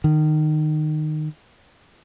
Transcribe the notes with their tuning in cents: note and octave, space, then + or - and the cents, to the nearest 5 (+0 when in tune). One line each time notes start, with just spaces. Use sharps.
D#3 -20